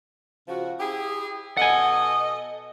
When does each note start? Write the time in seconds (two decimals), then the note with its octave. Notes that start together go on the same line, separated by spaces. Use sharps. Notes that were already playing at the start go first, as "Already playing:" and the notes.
0.48 C#3 F3 F#4
0.80 E4 G4 G#4
1.57 B2 A4 D#5 F#5 G#5